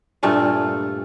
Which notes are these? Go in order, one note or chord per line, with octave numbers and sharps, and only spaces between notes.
G2 A#2 A3 F4